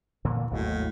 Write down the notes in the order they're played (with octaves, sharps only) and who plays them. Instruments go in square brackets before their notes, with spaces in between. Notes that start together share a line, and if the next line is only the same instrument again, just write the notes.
[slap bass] A#2 D3 E3
[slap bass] G#1 D#2 F#3 [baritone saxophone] A2